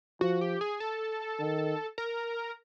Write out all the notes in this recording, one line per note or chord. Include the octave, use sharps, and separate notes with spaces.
F3 F#4
G4
G#4
A4
D#3
A#4